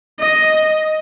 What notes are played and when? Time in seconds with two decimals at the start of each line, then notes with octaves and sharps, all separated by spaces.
0.20 D#5